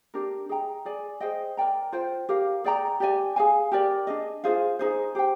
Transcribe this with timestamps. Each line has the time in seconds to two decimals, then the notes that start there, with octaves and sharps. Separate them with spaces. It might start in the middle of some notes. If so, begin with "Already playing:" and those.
0.14 D4 G4 A#4
0.49 G#4 D#5 G5 A#5
0.85 G#4 D5 G#5
1.20 G#4 C5 D#5 G5
1.57 A#4 D5 G5 A#5
1.93 F4 C5 G5
2.29 G4 A#4 F5
2.64 G#4 D5 G5 A#5
3.00 G4 D5 G#5
3.36 G#4 C5 F5 G#5
3.72 G4 A#4 D5
4.07 D4 G#4 D#5
4.44 F4 G#4 C5 F5
4.79 D#4 G#4 C5
5.15 G4 C5 G5